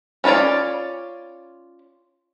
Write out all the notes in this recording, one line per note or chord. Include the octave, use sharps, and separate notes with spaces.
C#4 D4 F4 C#5 D5